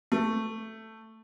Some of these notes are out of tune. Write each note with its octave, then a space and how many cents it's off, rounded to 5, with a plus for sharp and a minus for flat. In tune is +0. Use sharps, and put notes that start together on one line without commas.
A3 +10